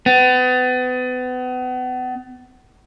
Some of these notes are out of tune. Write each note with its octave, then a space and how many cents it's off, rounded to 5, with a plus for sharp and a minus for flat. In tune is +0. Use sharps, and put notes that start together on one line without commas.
B3 +35